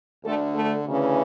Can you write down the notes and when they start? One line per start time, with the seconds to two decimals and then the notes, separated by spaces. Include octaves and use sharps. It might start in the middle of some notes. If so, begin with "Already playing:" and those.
0.24 D2 D3 A3 A4
0.54 A3 A4
0.85 D2 C#3 E3